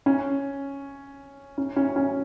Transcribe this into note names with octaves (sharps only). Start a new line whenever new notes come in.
C#4
C#4
C#4
C#4